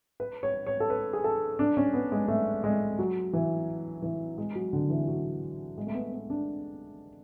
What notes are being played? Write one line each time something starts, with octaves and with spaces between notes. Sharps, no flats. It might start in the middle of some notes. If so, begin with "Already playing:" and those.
B4
C#5
C#5
A4
B4
G#4
A4
D4
C#4
B3
G#3
A3
G#3
F#3
E3
E3
G#3
F#3
D3
E3
F#3
G#3
A3
B3
B3
D4